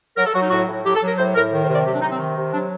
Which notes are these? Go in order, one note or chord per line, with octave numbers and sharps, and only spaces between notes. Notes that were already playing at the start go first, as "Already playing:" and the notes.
F#3 A#4
A4
F#3 F#4
D#4
A2 F#4
A2
F#3 G4
A4
F#3
A#4
A2 C5
A2 A#4
D#3
C5
C3
D5
F#3 G4
D4
C3 D#4
C4
D#3
C3
F#3 D4